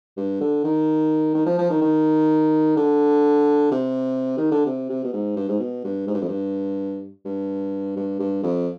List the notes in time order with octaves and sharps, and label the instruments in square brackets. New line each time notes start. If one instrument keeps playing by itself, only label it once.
[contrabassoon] G2
D3
D#3
D#3
F3
F3
D#3
D#3
D3
C3
D#3
D3
C3
C3
B2
G#2
G2
G#2
B2
G2
G#2
G2
F2
G2
G2
G2
G2
F2